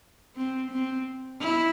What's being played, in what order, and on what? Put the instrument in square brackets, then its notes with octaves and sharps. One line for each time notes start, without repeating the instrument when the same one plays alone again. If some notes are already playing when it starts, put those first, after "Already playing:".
[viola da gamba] C4
C4
E4